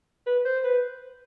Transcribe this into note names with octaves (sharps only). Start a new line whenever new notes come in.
B4
C5
B4